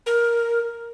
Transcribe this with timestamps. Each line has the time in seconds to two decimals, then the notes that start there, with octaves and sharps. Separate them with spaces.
0.06 A#4